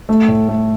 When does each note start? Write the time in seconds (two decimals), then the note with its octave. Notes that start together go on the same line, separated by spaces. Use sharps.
0.09 A3
0.28 A2
0.49 A3